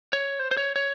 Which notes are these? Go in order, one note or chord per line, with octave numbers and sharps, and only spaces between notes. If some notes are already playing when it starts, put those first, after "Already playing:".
C#5
C5
C5
C#5
C#5